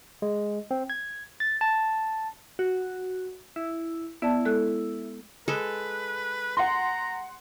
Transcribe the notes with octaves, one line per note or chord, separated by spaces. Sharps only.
G#3
C4
G#6
A6
A5
F#4
E4
B3 E4 D5 A5
G#3 A4 F#6
G#3 A4 B4
F#5 A#5 C6